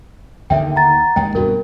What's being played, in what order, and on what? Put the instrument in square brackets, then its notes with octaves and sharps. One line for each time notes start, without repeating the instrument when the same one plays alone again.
[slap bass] D#2 D3 D#3 [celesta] E5 G5
[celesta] F#5 A#5 A6
[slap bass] D#2 G#3 [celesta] G5
[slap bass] C2 G2 B2 [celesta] F#4 A#4